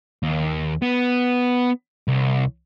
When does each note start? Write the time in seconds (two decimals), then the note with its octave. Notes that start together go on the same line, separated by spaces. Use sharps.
0.23 D#2
0.82 B3
2.08 C2